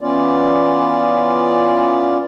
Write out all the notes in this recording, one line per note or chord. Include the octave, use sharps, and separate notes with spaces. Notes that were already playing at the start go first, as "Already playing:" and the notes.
E3 B3 C#4 F4 D5